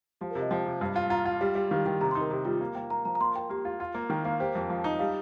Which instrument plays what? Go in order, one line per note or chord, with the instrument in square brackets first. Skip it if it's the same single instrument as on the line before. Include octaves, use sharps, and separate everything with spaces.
[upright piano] F3 [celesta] G4
[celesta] A#4
[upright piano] C3
[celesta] D#5
[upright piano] F3 [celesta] G5
[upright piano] C3
G2
F4
[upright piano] F4 [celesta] A#5
[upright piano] F4
[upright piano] G3 [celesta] G4
[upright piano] G3 [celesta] G4
[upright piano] D#3 [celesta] F5
[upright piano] D#3 [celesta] G5
[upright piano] C3 [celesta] A#5
[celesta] C6
[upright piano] D#4
[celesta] A#4
[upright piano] C3 [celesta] G4
[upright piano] G3 [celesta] F4
[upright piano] A#3
[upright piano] A#3 [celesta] G5
[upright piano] A#3 [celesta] A#5
[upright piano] F3 [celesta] A#5
[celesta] A#5
[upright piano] A#3 [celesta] C6
[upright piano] A#4 [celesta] G5
[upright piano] A#3 [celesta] G4
[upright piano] F4
F4
A#3
[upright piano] D#3 [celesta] G5
[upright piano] A#3 [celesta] F5
[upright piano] G4 [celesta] C5
[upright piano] F2
F3
D#4
[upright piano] G3 [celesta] F5